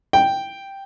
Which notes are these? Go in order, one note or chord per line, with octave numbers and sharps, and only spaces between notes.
G5